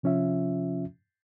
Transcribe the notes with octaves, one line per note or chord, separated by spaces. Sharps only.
C3 F3 C#4 F4 E5